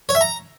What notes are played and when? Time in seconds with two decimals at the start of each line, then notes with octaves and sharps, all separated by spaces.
0.09 C#5
0.15 E5
0.21 A#5